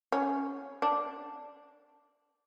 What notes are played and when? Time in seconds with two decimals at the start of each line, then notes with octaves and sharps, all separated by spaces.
0.12 C#4
0.82 D4